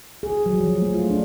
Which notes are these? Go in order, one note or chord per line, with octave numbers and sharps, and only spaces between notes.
G#4
F#3
F3
A3
F4
D4